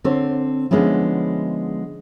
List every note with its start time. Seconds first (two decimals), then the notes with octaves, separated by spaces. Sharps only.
0.04 D3 C4 C5 C#5
0.71 D3 F3 G#3 B3 C#4 E4